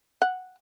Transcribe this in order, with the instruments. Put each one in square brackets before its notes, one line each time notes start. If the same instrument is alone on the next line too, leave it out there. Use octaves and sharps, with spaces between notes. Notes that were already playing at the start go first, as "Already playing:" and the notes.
[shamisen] F#5